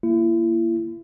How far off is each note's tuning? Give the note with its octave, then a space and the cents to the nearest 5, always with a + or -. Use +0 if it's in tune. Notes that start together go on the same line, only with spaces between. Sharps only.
A#3 +0 E4 +35